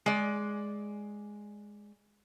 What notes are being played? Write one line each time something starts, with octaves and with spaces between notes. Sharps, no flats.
G#3 D5